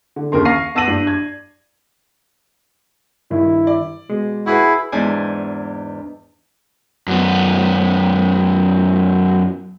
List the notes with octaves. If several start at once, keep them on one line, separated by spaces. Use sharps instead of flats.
D3
D#2 C#3 A#4 C6
F5 C#6 A#6 C7 D#7
B3 A5 E6 A#6 D#7 F#7
G2
G#6
G2 D#3 E4
D5
B2 G#3
E4 F#4 G#4 B4
E2 G#2 D4 C5 D5 G#5
F#2 B3